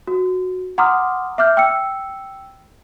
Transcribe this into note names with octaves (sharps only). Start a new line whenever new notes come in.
F#4
F#5 A#5 C6 D6 D#6 F6
E5 D6 F6 G6
G5 E6 C#7